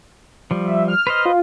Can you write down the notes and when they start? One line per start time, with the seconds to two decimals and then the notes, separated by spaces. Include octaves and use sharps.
0.51 F3 G3
0.65 E5
0.88 F6
1.07 B4 C5 D#5
1.26 F4